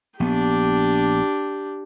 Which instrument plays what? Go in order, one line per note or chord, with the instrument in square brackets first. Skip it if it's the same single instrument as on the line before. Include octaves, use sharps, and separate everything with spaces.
[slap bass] A#1 B3 [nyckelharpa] D4 G4